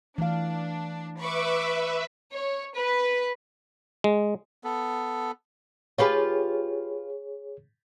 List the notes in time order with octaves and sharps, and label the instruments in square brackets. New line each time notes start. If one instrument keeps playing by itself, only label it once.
[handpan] E3 A3 F5 [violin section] D4
[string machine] B4 E5 [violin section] B5 C#6 D6
[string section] C#5
B4
[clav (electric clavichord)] G#3
[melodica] B3 A4
[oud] F4 G4 B4 [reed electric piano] G#4 C#5